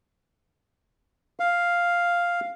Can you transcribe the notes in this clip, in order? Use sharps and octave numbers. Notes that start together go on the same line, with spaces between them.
F5